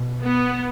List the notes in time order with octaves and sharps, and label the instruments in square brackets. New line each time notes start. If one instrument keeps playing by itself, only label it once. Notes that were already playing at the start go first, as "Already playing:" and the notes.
Already playing: [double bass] B2
[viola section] B3